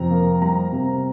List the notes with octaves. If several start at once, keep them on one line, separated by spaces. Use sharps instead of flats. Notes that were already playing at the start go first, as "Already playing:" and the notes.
Already playing: F2 C3 A#5
A#3
G3 A#5
C3